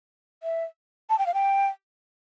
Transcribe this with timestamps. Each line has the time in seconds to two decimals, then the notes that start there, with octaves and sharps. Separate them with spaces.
0.43 E5
1.10 A5
1.19 G5
1.26 F5
1.34 G5